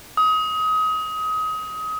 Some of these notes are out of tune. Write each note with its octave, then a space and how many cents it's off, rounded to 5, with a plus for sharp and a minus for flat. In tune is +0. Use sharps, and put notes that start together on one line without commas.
D#6 +25